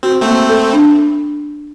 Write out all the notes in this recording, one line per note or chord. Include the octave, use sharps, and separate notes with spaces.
C4 F#4
A3 A#3 C4
A4
D4